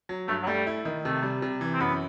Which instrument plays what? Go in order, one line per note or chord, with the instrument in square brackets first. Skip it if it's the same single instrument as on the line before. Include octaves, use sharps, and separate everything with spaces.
[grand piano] F#3
[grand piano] G2 [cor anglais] A3
[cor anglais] F#3
[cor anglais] G3 [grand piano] A3
[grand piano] E4
D#3
[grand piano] C3 [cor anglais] A3
[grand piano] G3
C3
E3
[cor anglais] C4
[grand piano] F#2 [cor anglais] B3